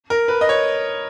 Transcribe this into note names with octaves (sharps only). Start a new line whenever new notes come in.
A#4
B4
D#5
C#5